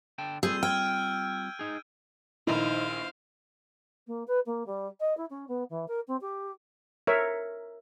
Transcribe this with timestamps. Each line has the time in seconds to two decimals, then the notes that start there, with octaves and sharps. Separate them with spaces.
0.18 D3 G5 A5
0.43 G3 C4 F4 G#4 E6 G6 D#7
0.63 G5 F6 G#6
0.86 D7
1.59 D#4 G#4
2.47 A#1 D#3 D#4 E4 C5 F5
4.07 A#3
4.28 B4
4.46 A#3
4.66 G3
5.00 D#5
5.17 E4
5.30 C#4
5.48 B3
5.70 E3
5.88 A#4
6.08 C4
6.21 G4
7.07 A#4 C#5 E5